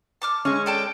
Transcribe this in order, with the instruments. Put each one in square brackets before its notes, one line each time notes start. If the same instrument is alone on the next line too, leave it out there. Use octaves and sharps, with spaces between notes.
[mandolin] A5 D6 F6
[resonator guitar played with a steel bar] G#3 C#4 [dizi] C#6
[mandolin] A4 D5 A5 [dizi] G5